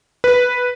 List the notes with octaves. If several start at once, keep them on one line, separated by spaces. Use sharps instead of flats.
B4